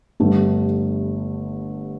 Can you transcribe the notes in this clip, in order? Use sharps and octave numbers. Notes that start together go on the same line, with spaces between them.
G1 G2 D3 A3